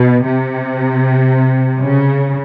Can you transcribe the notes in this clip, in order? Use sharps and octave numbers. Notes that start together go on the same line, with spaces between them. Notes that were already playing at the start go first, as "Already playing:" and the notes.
Already playing: B2
C3
C#3